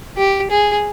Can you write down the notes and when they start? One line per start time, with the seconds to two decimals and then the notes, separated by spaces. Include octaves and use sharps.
0.17 G4
0.51 G#4